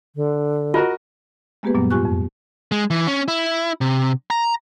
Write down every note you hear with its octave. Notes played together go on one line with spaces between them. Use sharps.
D3
F4 F#4 A#4 D#5
G#3 A#3 B3 G4 G#4 B4
F#2 A#2 F#3 G3 B3
G#2 F4 G4 G#5 C#6 F#6
F2
G#3
E3
C#4
E4
C3
A#5